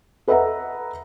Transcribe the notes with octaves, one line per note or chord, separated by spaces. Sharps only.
A4 B4 D#5 E5 F#5 A#5